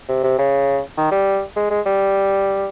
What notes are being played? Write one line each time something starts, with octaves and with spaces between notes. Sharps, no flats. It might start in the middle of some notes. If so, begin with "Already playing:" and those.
C3
C3
C#3
D#3
G3
G#3
G#3
G3